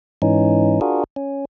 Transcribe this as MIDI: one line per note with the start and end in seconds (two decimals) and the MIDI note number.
0.22 0.80 44
0.22 0.80 52
0.22 0.80 61
0.22 0.80 63
0.81 1.04 62
0.81 1.04 65
0.81 1.04 66
0.81 1.04 68
0.81 1.04 70
1.16 1.45 61